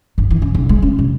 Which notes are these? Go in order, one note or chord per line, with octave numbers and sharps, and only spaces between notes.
G1
E3
C#3
B1
G#3
C#4
C3